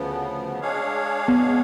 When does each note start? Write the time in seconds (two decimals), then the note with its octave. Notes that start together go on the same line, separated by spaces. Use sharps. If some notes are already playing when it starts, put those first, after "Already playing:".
Already playing: D2 C#3 F3 B3
0.59 G#3 D4 G#4 C#5 F5
1.28 B3